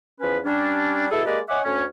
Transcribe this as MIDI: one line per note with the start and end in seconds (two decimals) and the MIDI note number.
0.21 0.38 40
0.21 0.38 53
0.21 0.38 61
0.21 0.38 71
0.45 1.07 55
0.45 1.07 61
0.45 1.07 62
1.11 1.24 47
1.11 1.24 64
1.11 1.24 68
1.11 1.24 69
1.26 1.40 56
1.26 1.40 58
1.26 1.40 67
1.26 1.40 71
1.26 1.40 74
1.26 1.40 75
1.49 1.60 73
1.49 1.60 75
1.49 1.60 76
1.49 1.60 78
1.49 1.60 80
1.49 1.60 86
1.65 1.84 38
1.65 1.84 61
1.65 1.84 73